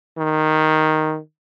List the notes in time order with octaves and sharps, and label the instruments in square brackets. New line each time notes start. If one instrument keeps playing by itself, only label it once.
[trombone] D#3